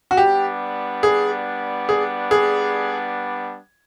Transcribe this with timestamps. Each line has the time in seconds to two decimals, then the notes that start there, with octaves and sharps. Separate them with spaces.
0.11 F#4
0.17 G3 B3 D4 G4
1.03 G#4
1.89 G#4
2.31 G#4